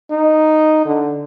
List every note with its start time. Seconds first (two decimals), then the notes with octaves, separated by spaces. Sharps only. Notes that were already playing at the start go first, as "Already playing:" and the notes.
0.11 D#4
0.85 D3